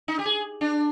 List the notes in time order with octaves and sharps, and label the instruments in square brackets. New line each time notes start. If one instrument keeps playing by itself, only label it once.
[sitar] D#4
G4
G#4
D4